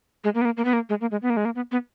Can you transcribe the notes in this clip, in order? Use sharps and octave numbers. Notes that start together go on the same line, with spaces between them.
G#3
A#3
B3
A#3
A#3
B3
A#3
G#3
A#3
G#3
B3
A#3
G#3
A#3
B3
B3